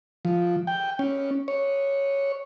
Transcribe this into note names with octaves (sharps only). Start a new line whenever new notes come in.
F3
G5
C#4
C#5